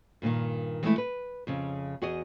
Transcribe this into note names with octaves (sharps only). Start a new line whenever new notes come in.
G2 A#2 D3 D#3
E3 G#3 A3 E4
B4
F2 C#3
E2 F#4 G#4 D#5